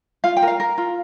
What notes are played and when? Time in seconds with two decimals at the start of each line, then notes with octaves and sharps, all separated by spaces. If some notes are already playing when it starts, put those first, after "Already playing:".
0.24 F4 F5
0.37 G5
0.42 A#4
0.47 F5
0.60 A#4
0.78 F4